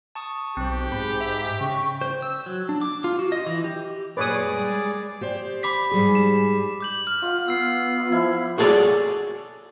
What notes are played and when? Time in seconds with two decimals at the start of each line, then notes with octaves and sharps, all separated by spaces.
0.15 A5 C#6 D#6
0.57 B1 C4 G4 C5
0.92 G#2 B5
1.21 E5
1.60 C#3 G5 C#6
2.01 C5
2.22 E6
2.46 F#3
2.69 D4
2.81 D6
3.04 F4
3.19 F#4
3.32 D#5
3.46 E3
3.64 G4
4.17 F#2 A#2 G#4 B4 C#5 D5 D6 D#6
4.51 G3 G#3
5.21 G4 C5 D5
5.63 B5 D6 B6
5.91 G#2 G3 G#4
6.15 E7
6.80 D6 G6 F#7
7.07 F6
7.22 F4 F5 F#5
7.48 B3 E6 C7
7.99 F4
8.12 F3 E4 B5
8.58 F#4 G#4 A4 C#5 D5